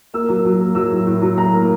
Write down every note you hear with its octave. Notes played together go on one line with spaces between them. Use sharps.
A#3 E6
F#3
F#3
A#3
F#3 E6
A2
A2
F#3
A2 A#5
A#3